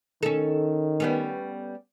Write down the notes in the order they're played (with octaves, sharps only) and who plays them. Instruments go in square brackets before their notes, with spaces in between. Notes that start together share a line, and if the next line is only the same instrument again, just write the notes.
[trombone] D#3 [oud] C#4 A4
[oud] G3 B3 C#4